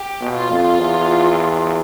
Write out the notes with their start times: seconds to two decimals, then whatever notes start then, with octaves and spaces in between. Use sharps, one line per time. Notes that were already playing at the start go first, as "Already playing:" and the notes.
Already playing: G4
0.21 B2
0.35 F4
0.50 F2
0.78 E2